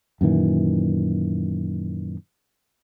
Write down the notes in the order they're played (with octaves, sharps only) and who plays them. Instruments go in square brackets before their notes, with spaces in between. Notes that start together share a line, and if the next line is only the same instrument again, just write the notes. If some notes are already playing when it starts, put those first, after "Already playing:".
[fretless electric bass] F#2 A#2 D#3 E3